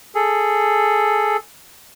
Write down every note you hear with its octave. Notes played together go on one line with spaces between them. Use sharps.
G#4 A4